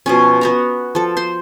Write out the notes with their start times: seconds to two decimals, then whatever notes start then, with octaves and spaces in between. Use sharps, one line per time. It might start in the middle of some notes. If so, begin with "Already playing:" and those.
0.06 B2 F3 C#4
0.41 B3 F#4 A#5
0.95 F3 A4
1.17 C5 C6